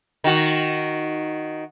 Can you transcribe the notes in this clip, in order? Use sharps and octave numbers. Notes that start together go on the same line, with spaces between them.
D#3 F#4